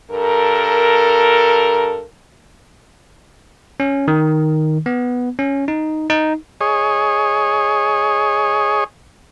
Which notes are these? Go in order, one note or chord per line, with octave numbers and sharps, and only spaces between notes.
G2 A4 A#4
C#4
D#3
B3
C#4
D#4
D#4
G#4 C#5 D#5